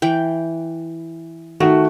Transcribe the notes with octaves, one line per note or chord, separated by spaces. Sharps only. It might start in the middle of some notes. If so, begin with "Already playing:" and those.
E3 G5
D#3 A3 F#4